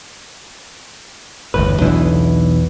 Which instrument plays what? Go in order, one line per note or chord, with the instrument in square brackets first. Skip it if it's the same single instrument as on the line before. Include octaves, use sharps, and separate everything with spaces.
[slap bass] G1 E2 A2 [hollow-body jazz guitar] B4
[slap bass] B1 B2 E3 [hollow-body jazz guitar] E2 D4 E4